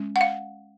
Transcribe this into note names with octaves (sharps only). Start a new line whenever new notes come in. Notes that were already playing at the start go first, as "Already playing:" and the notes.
Already playing: G#3 C#4
F#5
F5